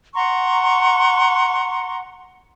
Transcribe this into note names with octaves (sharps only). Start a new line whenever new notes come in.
F#5 A#5 C6 C#6